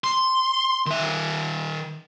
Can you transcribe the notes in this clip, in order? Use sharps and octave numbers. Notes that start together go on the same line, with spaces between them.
C6
D#3 E5